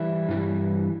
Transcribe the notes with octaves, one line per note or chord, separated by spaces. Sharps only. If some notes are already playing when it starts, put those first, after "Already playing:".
Already playing: E3 G3 E4
G2 E3 G3